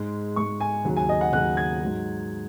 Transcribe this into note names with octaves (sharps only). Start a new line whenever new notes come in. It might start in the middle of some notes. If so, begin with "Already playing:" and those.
Already playing: G#2 G#3
G#2 G#3 C#6
G#5
D#2 C#3 F#3
G#5
D#5
F#5
D#2 C#3 F#3 F#6
G#6
G#2 F#3